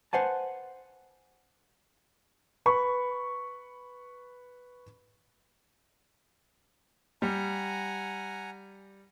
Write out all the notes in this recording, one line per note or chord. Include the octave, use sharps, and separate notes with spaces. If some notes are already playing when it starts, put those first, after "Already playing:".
B4 C5 F#5 G#5 A5
B4 B5 C#6
G3 F#5 G#5 A#5